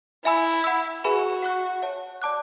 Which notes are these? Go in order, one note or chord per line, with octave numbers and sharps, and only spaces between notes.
E4 E5 G#5 B5 E6
F#5 B5 E6
F#4 G#4 B4 E5 G#5 B5
F#5 C#6 F#6
C#5 E5 A5
D5 A5 D6 F#6